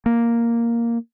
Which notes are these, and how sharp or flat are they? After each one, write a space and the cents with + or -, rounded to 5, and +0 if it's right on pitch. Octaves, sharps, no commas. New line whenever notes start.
A#3 +0